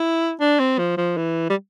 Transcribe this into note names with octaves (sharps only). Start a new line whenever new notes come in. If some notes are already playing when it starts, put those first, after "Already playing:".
Already playing: E4
D4
C4
F3
F3
E3
G3